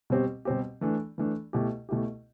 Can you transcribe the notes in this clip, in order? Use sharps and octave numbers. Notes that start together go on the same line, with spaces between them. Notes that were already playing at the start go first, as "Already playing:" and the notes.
B2 G3 C4 G4
B2 G3 C4 G4
E3 A3 D4
E3 A3 D4
B2 A3 E4 G4
B2 A3 E4 G4